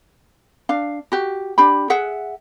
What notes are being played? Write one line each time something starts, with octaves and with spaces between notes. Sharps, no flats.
D4 F5
F#4 G4
D4 G4 B5
G#4 E5 F#5